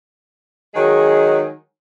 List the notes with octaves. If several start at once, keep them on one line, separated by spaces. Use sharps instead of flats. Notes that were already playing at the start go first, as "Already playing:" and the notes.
D#3 F#3 G#3 G#4